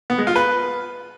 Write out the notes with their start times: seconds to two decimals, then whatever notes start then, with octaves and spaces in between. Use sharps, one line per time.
0.10 B3
0.18 G#3
0.27 F4
0.36 B4